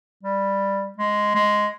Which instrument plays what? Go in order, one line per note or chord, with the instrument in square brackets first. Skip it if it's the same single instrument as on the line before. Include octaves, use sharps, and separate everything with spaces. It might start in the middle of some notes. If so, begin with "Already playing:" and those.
[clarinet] G3
G#3
G#3